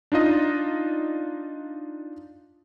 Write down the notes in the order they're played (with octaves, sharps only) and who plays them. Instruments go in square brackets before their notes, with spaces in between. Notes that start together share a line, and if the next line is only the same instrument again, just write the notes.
[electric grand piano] D4 D#4 F4 D#5